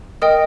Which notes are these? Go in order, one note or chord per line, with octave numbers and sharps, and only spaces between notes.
A#4 D#5 G5 D#6